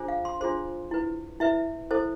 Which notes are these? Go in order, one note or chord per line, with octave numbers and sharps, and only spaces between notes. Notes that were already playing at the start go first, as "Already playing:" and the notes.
Already playing: D4 F4 G#4 C5
F5
C6
D4 F4 G#4 C5 C6
E4 B4
E4 B4 E5
E4 A4 C5